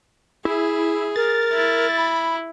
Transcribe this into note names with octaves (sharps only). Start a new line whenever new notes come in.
E4 G#4
A#4 A6
E4
B5